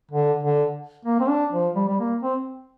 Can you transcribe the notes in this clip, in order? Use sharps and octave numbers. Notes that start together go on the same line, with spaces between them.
D3
D3
A#3
C4
D4
F3
G3
G3
A#3
C4